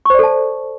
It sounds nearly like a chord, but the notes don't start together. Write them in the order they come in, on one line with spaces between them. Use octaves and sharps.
C#6 C5 D5 A4 A5